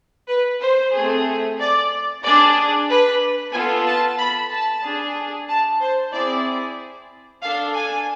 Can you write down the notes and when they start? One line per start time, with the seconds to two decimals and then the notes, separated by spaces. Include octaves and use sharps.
0.29 B4
0.62 C5
0.94 A3 C4 G#4
1.59 D5
2.24 D4 G#4 D5
2.89 B4
3.53 B3 F4 A4 G#5
3.86 A5
4.18 B5
4.51 A5
4.84 D4 G#4
5.49 A5
5.80 C5
6.12 C4 E4 G#4 D5
7.42 D4 A4 F5
7.74 G#5